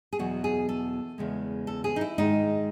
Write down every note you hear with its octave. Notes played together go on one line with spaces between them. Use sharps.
G#4
E2 B2 F#3 F#4
G#4
A4
E2 C#3 G#3
A4
G#4
D#4
E4
G#2 D#3 G#3 D#4